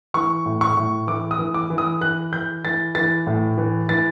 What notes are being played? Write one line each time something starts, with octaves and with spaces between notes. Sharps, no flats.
E3 C#6
A2
C#6
A2
E3 D6
D#6
E3
D6
E3
D#6
E3 F#6
E3 G6
E3 A6
E3 A6
A2
E3
E3 A6